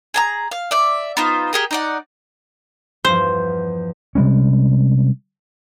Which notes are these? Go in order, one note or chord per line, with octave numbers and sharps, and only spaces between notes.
G#4 A5 A#5
F5
D5 E5
B3 D#4 F4 C5
G4 G#4 A#4
D#4 D5 F#5
E2 G2 F3 C5
C3 G3 G#3 C#4